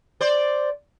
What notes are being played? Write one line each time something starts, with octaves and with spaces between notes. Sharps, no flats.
C5 D5